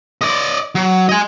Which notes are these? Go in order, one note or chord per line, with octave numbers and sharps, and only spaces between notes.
D5 D#5
F#3
D#5 G#5